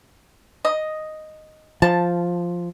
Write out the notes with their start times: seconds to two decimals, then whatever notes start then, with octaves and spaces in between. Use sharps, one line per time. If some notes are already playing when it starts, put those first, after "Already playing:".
0.65 D#5
1.82 F3 A5